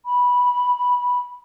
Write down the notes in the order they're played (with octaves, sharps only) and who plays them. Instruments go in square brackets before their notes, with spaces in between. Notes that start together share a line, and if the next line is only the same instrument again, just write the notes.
[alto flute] B5